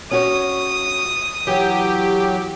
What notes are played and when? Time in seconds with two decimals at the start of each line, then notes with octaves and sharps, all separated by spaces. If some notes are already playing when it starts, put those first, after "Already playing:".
0.11 C#4 F#4 C#5 D#6
1.47 E3 F#3 G4